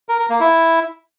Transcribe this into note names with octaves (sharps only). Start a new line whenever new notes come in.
A#4
A#4
A#3
E4